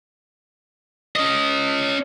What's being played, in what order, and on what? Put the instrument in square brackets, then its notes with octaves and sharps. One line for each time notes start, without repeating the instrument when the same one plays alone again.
[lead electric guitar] C#4 D#5